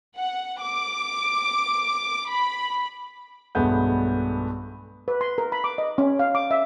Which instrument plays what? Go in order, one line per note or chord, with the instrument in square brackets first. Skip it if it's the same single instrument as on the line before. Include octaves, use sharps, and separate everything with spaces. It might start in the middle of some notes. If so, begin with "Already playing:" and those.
[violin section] F#5
D6
B5
[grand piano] B1 G2 G#3 A3 B3 G6
[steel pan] B4
C6
A#4
B5
D6
D#5
C#4
F5
D6
E5